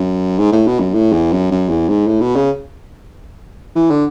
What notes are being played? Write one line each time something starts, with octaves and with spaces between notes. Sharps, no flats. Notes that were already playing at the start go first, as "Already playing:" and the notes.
Already playing: F#2
G#2
A2
B2
F#2
A2
E2
F#2
F#2
E2
G#2
A2
B2
C#3
E3
D3